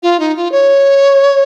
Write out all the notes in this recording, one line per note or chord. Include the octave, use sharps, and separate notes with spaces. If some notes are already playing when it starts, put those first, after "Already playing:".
F4
D#4
F4
C#5